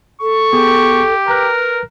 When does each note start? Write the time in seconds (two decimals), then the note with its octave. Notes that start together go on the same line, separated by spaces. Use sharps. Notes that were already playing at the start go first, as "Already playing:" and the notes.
0.21 A4 C#6
0.53 B3 G4 G#4
1.28 A#4 B4 A#5 F#6